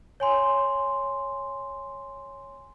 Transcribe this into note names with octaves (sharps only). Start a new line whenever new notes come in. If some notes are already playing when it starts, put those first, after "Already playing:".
C#5 G#5 C6